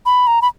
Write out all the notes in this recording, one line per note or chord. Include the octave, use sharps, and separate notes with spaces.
B5
A#5
B5